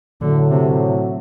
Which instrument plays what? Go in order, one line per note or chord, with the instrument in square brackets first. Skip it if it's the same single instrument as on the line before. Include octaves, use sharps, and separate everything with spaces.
[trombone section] A2 F#3 A3 [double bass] D3
[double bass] C3